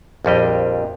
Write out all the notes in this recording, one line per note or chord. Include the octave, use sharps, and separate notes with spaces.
A#1 F2 G3 D#5